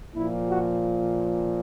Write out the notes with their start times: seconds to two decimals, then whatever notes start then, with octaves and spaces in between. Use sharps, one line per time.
0.15 A#2 F3 E4
0.50 F#4